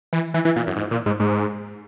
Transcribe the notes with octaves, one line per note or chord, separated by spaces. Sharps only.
E3
E3
E3
A#2
F#2
G#2
A#2
G#2
G#2